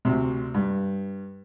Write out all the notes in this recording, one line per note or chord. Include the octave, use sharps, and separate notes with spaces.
D2 C3
G2